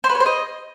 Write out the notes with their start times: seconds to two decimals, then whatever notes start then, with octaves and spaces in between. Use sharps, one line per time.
0.04 C5
0.09 B4
0.15 C#5
0.20 C5
0.26 D#5